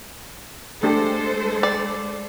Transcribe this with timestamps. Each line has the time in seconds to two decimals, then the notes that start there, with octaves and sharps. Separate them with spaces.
0.83 G#3 A3 D4 G4 A4 C5
1.63 D5